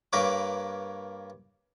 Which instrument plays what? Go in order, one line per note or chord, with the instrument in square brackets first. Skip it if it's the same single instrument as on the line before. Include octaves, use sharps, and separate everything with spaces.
[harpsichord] G2 A#3 A#4 B4 C#5 D6